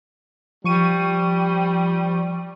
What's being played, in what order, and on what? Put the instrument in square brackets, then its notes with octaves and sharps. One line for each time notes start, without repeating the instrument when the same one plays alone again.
[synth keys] F3 C#6 D#7 [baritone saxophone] G3